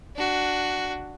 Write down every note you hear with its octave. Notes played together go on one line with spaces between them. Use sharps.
D4 F#4